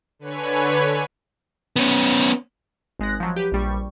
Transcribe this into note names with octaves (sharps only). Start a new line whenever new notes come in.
D3 B4 C#5 G#5
B3 C#4
G#1 G#3 F#6 A#6
F3 F#3
G4 B4
A#1 G3 C#6